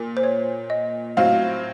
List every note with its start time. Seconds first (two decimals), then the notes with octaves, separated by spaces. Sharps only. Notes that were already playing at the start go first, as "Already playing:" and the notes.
Already playing: A#2 A#4
0.17 C5
0.24 C#5
0.70 D#5
1.17 A2 F#3 C4 F4 F5